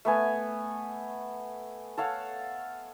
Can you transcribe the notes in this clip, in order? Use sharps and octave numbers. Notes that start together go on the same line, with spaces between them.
A3 B3 G#5
A4 C#5 F5 F#5